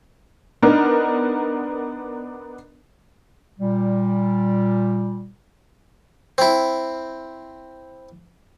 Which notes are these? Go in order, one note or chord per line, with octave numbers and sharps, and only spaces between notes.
B3 D4 D#4 A#4
A#2 G3
C4 E4